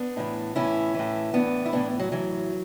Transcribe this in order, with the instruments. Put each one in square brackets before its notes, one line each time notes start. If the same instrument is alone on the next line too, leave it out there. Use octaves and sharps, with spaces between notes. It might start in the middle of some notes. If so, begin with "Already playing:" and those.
Already playing: [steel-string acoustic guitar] B3 D4
A2 E3
A2 E3 C#4 E4
A2 E3
A2 E3 B3 D4
E4
A2 E3 B3 D4
F#3
A2 E3 F#3